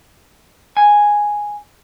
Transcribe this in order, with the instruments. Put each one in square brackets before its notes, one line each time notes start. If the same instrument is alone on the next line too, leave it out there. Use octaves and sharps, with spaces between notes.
[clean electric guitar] G#5